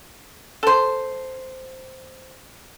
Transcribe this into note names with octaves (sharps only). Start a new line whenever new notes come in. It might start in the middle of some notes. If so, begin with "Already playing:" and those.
A4 C5